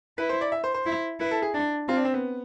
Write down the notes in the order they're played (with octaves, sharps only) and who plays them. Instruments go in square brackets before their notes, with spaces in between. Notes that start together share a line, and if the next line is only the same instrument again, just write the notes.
[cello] E4 [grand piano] B4
[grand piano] C5
D5
E5
C5
C5
[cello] E4
[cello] E4 [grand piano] B4
[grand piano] A4
G#4
[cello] D4
[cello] C4 [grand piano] F4
[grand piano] D4
C4
B3